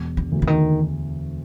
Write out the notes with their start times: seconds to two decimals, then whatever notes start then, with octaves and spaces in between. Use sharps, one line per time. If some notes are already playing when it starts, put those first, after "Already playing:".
Already playing: E1
0.17 D3
0.32 D2
0.42 D3
0.47 D#3